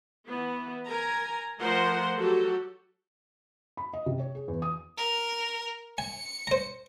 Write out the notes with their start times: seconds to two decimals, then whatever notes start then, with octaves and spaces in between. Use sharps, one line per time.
0.25 E3 B3
0.87 A#4 G#5 A#5
1.60 F3 A3 A#4 C5 F#5 C6
2.18 F#3 F#4 G4 A4
3.77 B5
3.93 D#5
4.06 C3
4.20 C#5
4.35 G#4
4.48 E2
4.62 D#6
4.97 A#4
5.98 G#5 C#7
6.47 C5 A#5